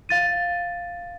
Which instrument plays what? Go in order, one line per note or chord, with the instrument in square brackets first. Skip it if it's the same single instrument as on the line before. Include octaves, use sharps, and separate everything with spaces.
[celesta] F5 A6 D#7